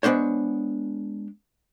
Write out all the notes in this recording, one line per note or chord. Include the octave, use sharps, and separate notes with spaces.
G#3 B3 D4 C5 C#5